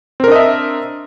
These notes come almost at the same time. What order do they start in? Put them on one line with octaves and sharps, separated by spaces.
C4 A#4 D4 D#5 E5